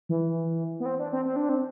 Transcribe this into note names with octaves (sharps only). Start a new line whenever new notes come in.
E3
B3
C4
D4
C4
C4
D4
C4